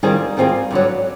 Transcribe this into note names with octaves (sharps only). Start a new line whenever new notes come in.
D#3 G3 C4 F4 G#4
D#3 G3 C4 F4 G#4
G2 D3 F#3